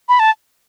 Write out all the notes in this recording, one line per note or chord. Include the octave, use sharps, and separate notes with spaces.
B5
A5